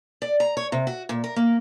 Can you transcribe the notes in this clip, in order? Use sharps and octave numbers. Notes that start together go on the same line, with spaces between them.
D5
A#5
C#5
C3
F#4
A#2
A#4
A#3